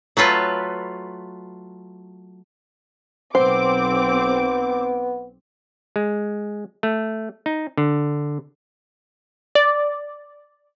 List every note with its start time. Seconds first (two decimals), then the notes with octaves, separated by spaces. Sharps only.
0.17 F#3 A3 F4 B4
3.35 B1 B3 C4 C5 D6
5.96 G#3
6.83 A3
7.46 D#4
7.78 D3
9.55 D5